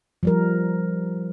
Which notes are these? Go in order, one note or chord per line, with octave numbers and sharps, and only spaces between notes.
F3 G3 A#4